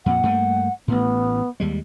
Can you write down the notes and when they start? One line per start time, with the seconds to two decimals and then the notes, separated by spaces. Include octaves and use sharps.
0.06 F2 A#2 F#5
0.23 G2 A3 A#3
0.88 A1 A2 B3
1.60 D#2 G3 G#3